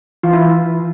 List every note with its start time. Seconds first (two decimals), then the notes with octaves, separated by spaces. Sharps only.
0.23 E3 F4
0.33 E4